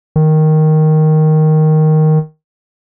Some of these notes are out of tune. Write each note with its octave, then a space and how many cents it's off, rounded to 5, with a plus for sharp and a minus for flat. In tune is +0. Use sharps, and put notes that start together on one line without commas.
D#3 +0